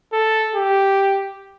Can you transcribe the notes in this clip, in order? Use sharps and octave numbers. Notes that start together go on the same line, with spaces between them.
A4
G4